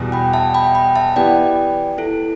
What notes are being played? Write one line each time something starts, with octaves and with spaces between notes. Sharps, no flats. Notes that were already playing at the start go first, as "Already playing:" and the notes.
Already playing: E2 B2 G3
G5 B5
E5 A5
G5 B5
G5 B5
E5 A5
E3 B3 G4 D5 G5
E4 A4